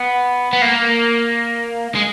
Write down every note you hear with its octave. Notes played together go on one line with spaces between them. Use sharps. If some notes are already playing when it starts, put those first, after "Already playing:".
Already playing: B3
B3
A#3
G#3